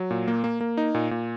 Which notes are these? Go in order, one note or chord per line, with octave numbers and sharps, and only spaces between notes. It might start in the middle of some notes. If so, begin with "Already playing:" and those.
Already playing: F#3
A#2
A#3
A#3
A#3
D#4
A#2
A#2